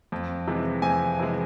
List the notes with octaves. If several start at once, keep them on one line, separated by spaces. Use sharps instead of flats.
F2
C3 E3 G#3
F2 G#5
C3 E3 G#3